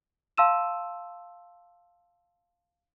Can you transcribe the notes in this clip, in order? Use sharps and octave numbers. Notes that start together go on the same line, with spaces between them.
F5 A5 C6 E6 D#7 E7